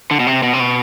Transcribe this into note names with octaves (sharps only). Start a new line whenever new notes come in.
D3
B2
C3
B2
C3
B2